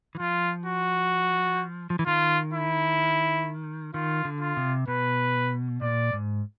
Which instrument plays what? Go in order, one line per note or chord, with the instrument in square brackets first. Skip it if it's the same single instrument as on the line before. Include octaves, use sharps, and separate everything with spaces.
[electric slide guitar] E3
[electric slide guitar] F3 [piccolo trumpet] F4
[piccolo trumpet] F#4
[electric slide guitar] F3
E3
[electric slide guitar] D#3 [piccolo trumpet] F4
[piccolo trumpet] E4
[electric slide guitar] D#3 [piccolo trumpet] F4
[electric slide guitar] D3
[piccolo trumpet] F4
[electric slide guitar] C3
[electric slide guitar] B2 [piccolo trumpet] B4
[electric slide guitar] A#2 [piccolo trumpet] D5
[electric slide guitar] G#2